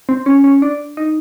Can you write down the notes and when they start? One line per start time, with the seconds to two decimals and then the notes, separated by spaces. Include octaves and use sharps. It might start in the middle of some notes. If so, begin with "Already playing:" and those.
0.09 C4
0.26 C#4
0.44 C#4
0.62 D4
0.97 D#4